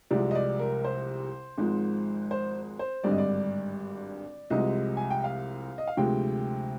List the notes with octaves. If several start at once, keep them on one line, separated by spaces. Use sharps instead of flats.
C2 C3 F3 G#3 D5
D#5
D5
A#4
C5
G#1 G#2 F3 G#3
C5
C5
G#1 G2 D3 G3 D5
D#5
D5
C2 C3 F3 G#3 D#5
G#5
G5
F5
D#5
F5
D2 C3 F3 G#3 G5